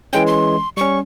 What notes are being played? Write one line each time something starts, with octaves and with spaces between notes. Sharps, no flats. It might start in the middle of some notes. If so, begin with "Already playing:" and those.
E3 G#3 C#4 G5
C6
G3 C#4 C#6